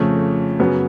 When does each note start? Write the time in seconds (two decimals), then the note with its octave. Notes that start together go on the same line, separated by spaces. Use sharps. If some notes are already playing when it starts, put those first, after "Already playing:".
Already playing: F2 C#3 F3 A3
0.60 F#2 C#3 F#3 B3